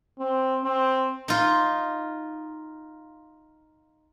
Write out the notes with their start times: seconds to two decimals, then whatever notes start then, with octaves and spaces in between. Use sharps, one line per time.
0.19 C4
0.65 C4
1.28 D#4 F4